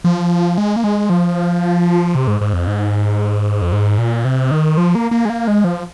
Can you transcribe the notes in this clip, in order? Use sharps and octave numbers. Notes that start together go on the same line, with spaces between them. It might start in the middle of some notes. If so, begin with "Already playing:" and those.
F3
G#3
A#3
G#3
F3
C3
G#2
G#2
F2
G#2
F2
G#2
A#2
C3
D#3
F3
A#3
A#3
G#3
A#3
G#3
F3